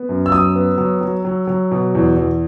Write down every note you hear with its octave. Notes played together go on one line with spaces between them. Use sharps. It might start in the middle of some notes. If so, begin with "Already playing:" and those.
Already playing: B3
F#2
E6
F#3 D#6
B3
F#3
F#3
F#3
F#3
B2
E2
E2